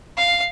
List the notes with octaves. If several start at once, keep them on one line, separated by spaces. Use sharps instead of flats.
F5